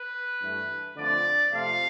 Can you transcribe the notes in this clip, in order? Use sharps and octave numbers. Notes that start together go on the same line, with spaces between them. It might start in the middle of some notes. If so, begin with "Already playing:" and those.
Already playing: B4
G2 E3 A3
D3 F3 A3 C4 D5
C3 F3 A3 C4 F5